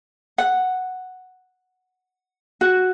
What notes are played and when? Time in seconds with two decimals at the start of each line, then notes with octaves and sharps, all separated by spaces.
0.38 F#5
2.61 F#4